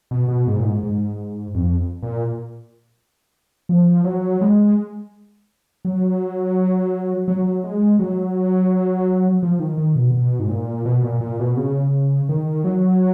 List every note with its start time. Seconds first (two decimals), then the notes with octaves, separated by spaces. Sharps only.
0.11 B2
0.28 B2
0.47 G#2
0.59 A#2
0.65 G#2
0.83 G#2
1.55 F2
2.03 A#2
3.69 F3
4.04 F#3
4.41 G#3
5.85 F#3
7.28 F#3
7.64 G#3
7.99 F#3
9.43 F3
9.60 D#3
9.78 D#3
9.95 B2
10.14 B2
10.39 G#2
10.49 A#2
10.85 B2
11.04 A#2
11.21 A#2
11.40 B2
11.57 C#3
12.29 D#3
12.64 F#3